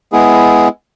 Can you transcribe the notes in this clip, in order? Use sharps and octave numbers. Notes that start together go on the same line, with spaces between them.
G#3 B3 E4 G#4